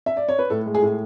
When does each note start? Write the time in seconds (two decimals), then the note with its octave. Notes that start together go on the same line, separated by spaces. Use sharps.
0.06 E5
0.17 D5
0.28 C#5
0.39 B4
0.50 A2 A4
0.66 G#3
0.75 G#4
0.82 A2